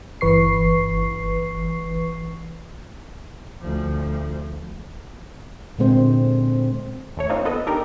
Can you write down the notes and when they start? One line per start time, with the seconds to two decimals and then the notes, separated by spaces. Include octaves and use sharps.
0.21 G1 E3 B4 C#6 C7
3.61 D2 F3
5.79 A#2 D3 G#3 C4 C5
7.17 D#2 A3 C#5
7.29 A#3 C4 D4 D#4 F4
7.45 D#3 B3 A4 B4 D#5
7.67 D4 D#4 G4 A4 A#4 D5